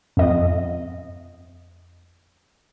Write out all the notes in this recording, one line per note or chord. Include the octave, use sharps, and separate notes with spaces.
F2 D#5